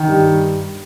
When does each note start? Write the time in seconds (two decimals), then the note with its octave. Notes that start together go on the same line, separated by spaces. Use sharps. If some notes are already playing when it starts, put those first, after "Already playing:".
Already playing: D#3
0.08 G2